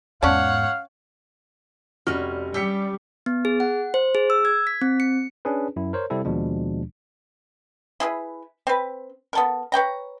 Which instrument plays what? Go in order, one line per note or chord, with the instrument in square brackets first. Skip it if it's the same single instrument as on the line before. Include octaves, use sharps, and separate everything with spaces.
[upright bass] E2 G#2 [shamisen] C#4 D5 A5 [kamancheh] C#5 F#5 [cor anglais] F5
[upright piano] F1 F#4 F6 [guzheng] G3 C#4
[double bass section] G3 [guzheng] G4 [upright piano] E6 B6 C#7
[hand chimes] B3
G#4
F#5
C5
G#4
E6
G#6
B6
C4
C#7
[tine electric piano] C#4 D4 G#4 B4
F#2 E4
A#4 C5 C#5
C3 G3 C4 E4 A4
D#2 B2 F3 G#3 D4
[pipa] E4 G#4 B4
C4 B4
B3 A4 A#4
B4 C#5 G5 A#5